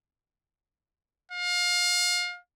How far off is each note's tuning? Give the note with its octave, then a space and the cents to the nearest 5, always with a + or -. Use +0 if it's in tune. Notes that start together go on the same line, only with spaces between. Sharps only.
F5 +30